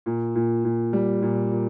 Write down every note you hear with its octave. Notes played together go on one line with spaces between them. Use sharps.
A#2
A#2
A#2
G3
A#2
A#2